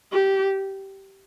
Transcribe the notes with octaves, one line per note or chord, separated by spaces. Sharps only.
G4